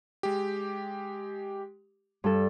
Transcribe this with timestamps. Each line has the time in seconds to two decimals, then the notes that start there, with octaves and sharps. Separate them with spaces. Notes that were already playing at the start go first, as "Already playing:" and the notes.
0.23 G#3 G4
2.24 G2 A4